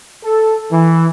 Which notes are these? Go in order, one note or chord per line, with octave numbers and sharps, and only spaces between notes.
A4
E3